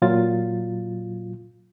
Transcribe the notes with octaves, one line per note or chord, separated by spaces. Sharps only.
A#2 F#3 F4 A6